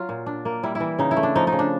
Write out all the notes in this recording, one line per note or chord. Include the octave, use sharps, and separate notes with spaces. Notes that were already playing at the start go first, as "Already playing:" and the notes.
Already playing: F#3 F4
A#2
D4
A#3
G3 E4
E4
E3
C#3 D#4
E4
A3
D4
F3 D#4
D#4
C#3
D4